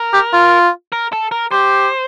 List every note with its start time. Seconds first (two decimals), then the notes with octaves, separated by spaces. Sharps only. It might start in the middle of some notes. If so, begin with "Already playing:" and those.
Already playing: A#4
0.14 G4
0.33 F4
0.92 A#4
1.13 A4
1.31 A#4
1.52 G4 C5